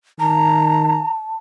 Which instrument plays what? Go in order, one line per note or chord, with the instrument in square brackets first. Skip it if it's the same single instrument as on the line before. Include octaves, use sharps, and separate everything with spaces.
[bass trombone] D#3 [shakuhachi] A5 [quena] A#5